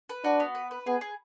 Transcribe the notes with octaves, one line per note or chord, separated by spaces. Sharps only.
B4
D4 F#4
B3
B4
B4
B3 G#4
G#4